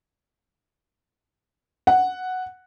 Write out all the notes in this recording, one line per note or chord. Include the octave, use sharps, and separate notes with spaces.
F#5